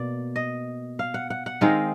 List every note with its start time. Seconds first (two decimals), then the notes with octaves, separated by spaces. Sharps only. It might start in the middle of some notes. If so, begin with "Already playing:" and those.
Already playing: B2 A#3 D5
0.36 D#5
0.99 F5
1.14 F#5
1.30 F#5
1.46 F#5
1.61 D#3 G#3 C4 D#4 F5